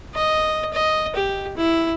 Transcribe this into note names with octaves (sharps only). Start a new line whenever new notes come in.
D#5
D#5
G4
E4